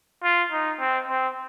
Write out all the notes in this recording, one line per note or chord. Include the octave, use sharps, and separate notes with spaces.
F4
D#4
C4
C4